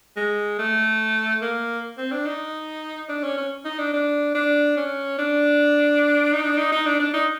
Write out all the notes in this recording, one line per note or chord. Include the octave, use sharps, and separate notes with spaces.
G#3
A3
A#3
C4
D4
D#4
D4
C#4
C#4
D#4
D4
D4
D4
C#4
D4
D#4
D4
D#4
D#4
D4
D4
D#4